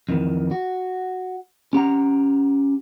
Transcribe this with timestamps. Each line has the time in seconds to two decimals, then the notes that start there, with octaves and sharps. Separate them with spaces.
0.09 F2 D#3 E3
0.51 F#4
1.73 C#4 G4 F#5 A#5